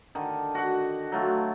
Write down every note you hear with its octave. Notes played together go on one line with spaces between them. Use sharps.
D3 D#3
F#4 F#5
F#3 A3 F4